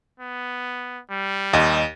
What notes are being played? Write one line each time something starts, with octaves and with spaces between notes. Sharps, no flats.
B3
G3
D#2 D#5